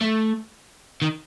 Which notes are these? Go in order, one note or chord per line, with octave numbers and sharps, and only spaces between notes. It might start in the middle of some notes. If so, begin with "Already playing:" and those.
A3
D#3